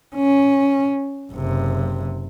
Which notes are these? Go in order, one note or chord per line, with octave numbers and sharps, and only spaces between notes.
C#4
F#1 C3